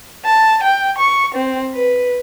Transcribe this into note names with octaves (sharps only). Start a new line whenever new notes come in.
A5
G5
C#6
C4
B4